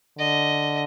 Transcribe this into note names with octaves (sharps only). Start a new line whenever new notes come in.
D3 D#5